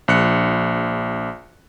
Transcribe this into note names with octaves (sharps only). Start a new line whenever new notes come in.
A#1 F#6 C#7